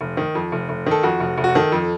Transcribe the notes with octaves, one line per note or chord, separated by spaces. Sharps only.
F1
D#3
F2
F1
F1
D#3 A4
F2 F#4
F1
F1
F#4
D#3 A4
F2